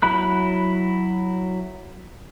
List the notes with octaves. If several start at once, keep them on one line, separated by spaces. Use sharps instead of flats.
F#3 E4 B5 F#6